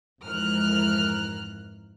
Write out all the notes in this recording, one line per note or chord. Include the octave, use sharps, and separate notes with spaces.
F2 G#2 E3 A#4 F6 F#6